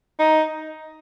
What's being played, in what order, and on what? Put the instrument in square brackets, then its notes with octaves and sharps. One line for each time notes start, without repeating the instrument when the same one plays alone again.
[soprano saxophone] D#4